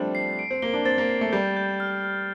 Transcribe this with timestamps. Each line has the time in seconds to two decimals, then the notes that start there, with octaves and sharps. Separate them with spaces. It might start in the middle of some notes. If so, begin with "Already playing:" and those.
Already playing: F3 G3 A3 C4 D4
0.15 C7
0.39 D7
0.50 C4
0.62 A#3 G7
0.74 D4
0.85 C4 A6
0.98 A#3
1.09 C7
1.21 A3
1.32 G3 G6
1.56 G6
1.80 F6
2.04 F6